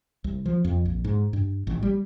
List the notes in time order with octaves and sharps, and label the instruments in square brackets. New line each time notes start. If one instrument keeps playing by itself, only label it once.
[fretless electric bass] C2
F3
F2
A#1
G#2
G2
A1
G3